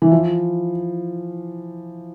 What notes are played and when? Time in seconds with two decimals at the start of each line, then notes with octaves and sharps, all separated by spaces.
0.02 E3
0.12 F3